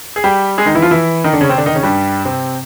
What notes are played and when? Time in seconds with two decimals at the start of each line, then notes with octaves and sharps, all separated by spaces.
0.16 G#4
0.24 G3 G4
0.58 G#3 G#4
0.66 D#3 D#4
0.75 E3 E4
0.82 F3 F4
0.91 E3 E4
1.24 D#3 D#4
1.33 D3 D4
1.41 C#3 C#4
1.49 C3 C4
1.58 D3 D4
1.66 D#3 D#4
1.75 C#3 C#4
1.83 G2 G3
2.25 C3 C4